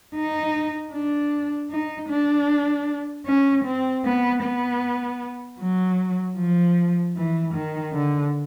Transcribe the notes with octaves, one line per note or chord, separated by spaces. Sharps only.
D#4
D4
D#4
D4
C#4
C4
B3
B3
F#3
F3
E3
D#3
D3